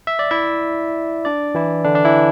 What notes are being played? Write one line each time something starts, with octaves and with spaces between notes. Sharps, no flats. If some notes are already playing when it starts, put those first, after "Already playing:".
E5
D5
E4 E5
D4 D5
E3 E4
D3 D4
D4
E3 E4